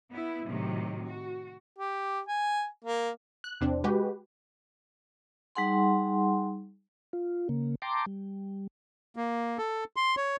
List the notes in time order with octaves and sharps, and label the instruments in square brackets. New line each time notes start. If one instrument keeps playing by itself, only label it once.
[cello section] B3 E4
A2 C3 D#3 F#3
F#4
[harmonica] G4
G#5
A#3
[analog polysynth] F#6
E2 C3 C4 D4
G#3 F#4 G4 B4
[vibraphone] G3 D#4 G#4 F#5 G#5 C6
[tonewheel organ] F4
C#3 A#3
G5 A5 A#5 C6 D6
G3
[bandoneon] A#3
A4
C6
C#5